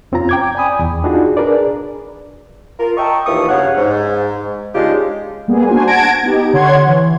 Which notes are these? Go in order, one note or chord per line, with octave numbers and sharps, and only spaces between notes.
F2 C4 C#4 F4 A#5
G5 D6 G#6
D5 G5 G#5 B5 D#6
E2
D4 D#4 F4 F#4 G#4
D4 G#4 A#4 B4 D5
F4 A#4
D#5 E5 G5 A5 A#5 C#6
D#2 E3 F3 A#3 C#6 D#6
G2 C#3 C#5 F5 F#5
G#2
C#3 G#3 D4 D#4 F4 G4
G3 A#3 B3 G#4
D4 F#4 C5 G#5
F#5 A5 G#6 A#6 D7
B3 D#4 G4
D3 C#5 F#5 C6 G#6
E3